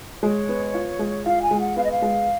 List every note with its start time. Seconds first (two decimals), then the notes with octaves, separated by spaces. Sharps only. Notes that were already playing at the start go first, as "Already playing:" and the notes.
0.23 G#3 C#5
0.49 B3
0.74 F4
0.99 G#3
1.26 F4 F5
1.42 G#5
1.51 G#3
1.60 F#5
1.76 B3 F5
1.84 D#5
1.91 F5
2.02 G#3